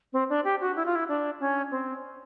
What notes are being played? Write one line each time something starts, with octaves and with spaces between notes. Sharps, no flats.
C4
D4
G4
F#4
E4
F4
E4
D4
C#4
C4